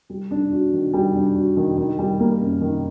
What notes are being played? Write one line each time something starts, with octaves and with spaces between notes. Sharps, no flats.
G3
D4
F#4
D#3
G3
D4
F#4
D#3
D#3
G3
A#3
F#2
D#3